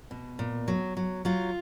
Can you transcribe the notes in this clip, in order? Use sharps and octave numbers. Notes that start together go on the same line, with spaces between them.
B2
A#2
F#3
F#3
F#3 F4